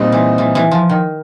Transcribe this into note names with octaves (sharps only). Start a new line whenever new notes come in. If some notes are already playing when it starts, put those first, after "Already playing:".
Already playing: A#2 G3 C4 D#4
E3
E3
E3
F3
D#3